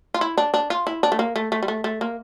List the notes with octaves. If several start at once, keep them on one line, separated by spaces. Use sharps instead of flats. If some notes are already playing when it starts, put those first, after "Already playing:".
F4
E4
D4
D4
F4
E4
D4
A3
A#3
A3
A3
G3
A3
A3
A#3